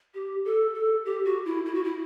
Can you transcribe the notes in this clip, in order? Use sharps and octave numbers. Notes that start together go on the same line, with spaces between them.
G4
A4
A4
G4
F#4
E4
E4
F#4
E4